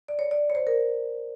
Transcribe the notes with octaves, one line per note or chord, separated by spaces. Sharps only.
D5
C#5
D5
C#5
C5
A#4